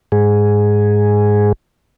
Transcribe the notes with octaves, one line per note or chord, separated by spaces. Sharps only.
G#2 G#4